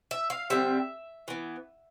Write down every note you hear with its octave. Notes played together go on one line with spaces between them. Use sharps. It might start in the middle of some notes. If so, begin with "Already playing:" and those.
E5
F5
D3 G3 C4 E5
E3 B3